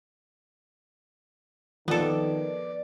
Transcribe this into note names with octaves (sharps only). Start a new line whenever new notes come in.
D#3 F3 B3 A4 D5